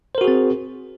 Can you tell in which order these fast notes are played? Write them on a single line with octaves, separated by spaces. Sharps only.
C5 A#4 F#4 G#4 C4